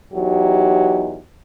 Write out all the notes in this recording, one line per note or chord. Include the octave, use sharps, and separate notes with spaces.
E2 F#3 D#4 G4